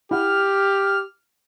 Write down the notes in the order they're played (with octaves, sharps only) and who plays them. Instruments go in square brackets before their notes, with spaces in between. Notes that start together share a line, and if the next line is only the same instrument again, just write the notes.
[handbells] E4 F#5 [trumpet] G4 [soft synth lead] F6